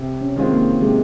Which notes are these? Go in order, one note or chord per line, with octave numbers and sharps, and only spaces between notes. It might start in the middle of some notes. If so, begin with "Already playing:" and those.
Already playing: C3
C#4
D#3 G#3 C4 F4
A#3
C3 G#3